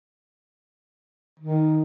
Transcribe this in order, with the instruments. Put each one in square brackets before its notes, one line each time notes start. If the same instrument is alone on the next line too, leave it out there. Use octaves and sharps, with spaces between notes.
[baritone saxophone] D#3